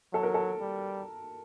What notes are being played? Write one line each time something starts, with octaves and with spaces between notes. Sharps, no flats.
F#3 A4
A#4
A4
G3